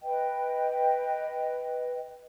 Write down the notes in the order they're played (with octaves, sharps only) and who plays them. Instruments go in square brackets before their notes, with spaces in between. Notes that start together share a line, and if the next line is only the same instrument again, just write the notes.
[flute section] B4 D#5 G5